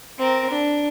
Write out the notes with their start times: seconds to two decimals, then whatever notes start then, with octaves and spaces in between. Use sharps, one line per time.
0.18 C4 A#4
0.50 D4